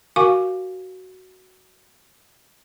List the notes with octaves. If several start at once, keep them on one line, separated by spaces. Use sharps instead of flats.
F#4 A#4 F5 G#5 C#6 D6